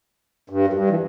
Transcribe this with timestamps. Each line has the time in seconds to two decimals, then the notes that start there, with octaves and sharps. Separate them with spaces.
0.50 G2
0.67 F#2
0.73 G2
0.90 E3